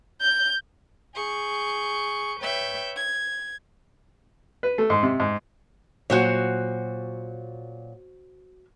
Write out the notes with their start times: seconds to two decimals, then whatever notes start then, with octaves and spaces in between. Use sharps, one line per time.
0.21 G6
1.14 G#4 C#6 G6
2.41 B4 C#5 E5 G5 G6
2.94 G#6
4.63 B4
4.78 A3
4.90 G#2
5.03 C3
5.20 G#2
6.10 A#2 F#3 F#4 C5 C#5